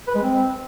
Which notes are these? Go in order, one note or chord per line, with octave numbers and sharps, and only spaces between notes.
B4
G#3
C4